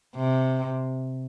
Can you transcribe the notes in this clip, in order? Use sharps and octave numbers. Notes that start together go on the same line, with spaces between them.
C3